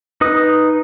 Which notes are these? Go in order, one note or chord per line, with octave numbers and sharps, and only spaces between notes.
D#4 B4 D#6